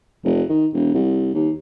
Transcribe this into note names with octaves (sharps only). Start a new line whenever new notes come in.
F1
D#3
E1
C2
D#2